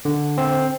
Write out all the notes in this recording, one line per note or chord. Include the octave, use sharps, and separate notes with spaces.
D3
C4